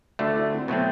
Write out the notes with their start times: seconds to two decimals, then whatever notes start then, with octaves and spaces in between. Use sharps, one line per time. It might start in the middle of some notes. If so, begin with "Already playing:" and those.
0.19 D2 D3 A3 F#4
0.36 E4
0.52 C4
0.68 B2 F#3 A3 B3 C4